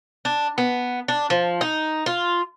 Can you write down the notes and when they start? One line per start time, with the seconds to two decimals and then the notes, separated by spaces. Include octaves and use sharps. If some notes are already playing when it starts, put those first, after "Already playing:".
0.25 D4
0.58 B3
1.08 D4
1.30 F3
1.61 D#4
2.06 F4